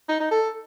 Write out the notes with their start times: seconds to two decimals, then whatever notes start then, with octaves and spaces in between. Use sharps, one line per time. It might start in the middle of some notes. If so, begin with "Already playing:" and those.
0.09 D#4
0.20 D#4
0.31 A4